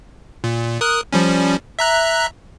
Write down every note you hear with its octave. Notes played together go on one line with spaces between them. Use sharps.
A#2
A#4 D#6 F#6
F3 G3 C#4
E5 A#5 F#6